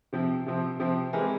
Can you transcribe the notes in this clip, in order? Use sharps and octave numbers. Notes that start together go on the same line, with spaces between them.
C3 F3 C4
C3 F3 C4
C3 F3 C4
E3 G#3 C4 G4 A#4